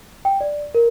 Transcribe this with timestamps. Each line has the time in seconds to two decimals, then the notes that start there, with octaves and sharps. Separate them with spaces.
0.25 G5
0.41 D5
0.75 A#4